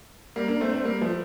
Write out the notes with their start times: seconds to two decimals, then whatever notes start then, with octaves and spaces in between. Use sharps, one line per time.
0.36 G3 A#3
0.48 A#3 D4
0.61 A3 C4
0.69 D4
0.73 A3 C4
0.85 G3 A#3
1.01 F3 A3